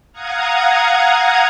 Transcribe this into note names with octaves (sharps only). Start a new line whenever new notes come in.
F5 F#5 A#5 D#6 G#6